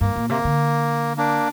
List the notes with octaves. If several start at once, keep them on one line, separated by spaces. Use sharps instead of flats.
G2 A#3
A#2
C3 A#3
D3
A#3 D4